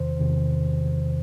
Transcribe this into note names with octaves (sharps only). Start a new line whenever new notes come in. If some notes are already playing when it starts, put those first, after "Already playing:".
Already playing: E2 C3 D#3 C5
E2 C3 D#3